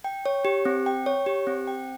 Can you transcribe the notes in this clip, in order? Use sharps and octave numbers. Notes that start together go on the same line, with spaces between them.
G5
C#5
G4
C4
G5
C#5
G4
C4
G5